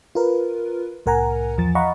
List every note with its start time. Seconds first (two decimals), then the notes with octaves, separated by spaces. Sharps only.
0.15 F4 A#4 B4
1.06 C2 A2 A#4 F#5 G#5 A#5
1.58 E2 F3 A6
1.75 D#5 F5 F#5 A#5 B5 C#6